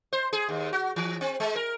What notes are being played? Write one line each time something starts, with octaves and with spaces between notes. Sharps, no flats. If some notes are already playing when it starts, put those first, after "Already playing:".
C5
G#4
D#2
F#4
E3
C4
G#3
A#4